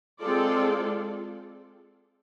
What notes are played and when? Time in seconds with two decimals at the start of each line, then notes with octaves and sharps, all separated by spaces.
0.20 G#3 C4 F4 A4 D5